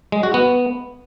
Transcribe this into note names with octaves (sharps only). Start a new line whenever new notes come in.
G#3
F#4
B3